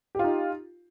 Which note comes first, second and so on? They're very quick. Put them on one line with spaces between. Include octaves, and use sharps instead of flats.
G4 F4 D#4